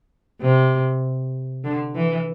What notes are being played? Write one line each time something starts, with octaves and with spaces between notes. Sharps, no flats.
C3
D3
E3